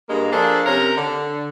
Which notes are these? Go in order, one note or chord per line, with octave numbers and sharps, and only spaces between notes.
G2 G#3 A#3
F3 A#3 D4 G#4 A4
C3 C#4 A#4
D3